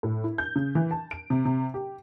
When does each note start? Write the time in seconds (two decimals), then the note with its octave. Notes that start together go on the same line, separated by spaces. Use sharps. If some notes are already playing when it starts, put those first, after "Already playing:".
0.03 A2
0.24 E4
0.38 G6
0.56 C#3
0.75 E3
0.91 A5
1.11 D7
1.30 C3
1.45 C3
1.74 G4